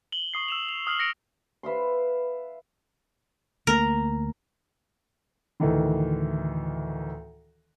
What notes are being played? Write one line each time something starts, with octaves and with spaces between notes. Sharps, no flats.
F#7 G7
C#6 D#6 C7
E6 E7 F7
F7
D#6 F6 C7 F#7
A#6 C#7 D7 F7
B4 E5 F5 C6
D2 A3 A#3 A#4
D2 A2 D#3 E3